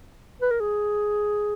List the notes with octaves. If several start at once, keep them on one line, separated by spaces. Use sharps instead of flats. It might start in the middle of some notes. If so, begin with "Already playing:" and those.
B4
A#4
G#4